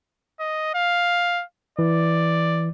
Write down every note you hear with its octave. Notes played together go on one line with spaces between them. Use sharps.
D#5
F5
E3 D5